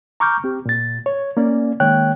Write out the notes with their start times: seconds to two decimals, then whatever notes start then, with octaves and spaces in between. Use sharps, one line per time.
0.20 A#5 C#6 D6 F6 G6
0.44 C4 G4
0.66 A#2 A6
1.06 C#5
1.37 A#3 C#4 D5
1.80 D#3 G#3 A#3 C#5 G5 F#6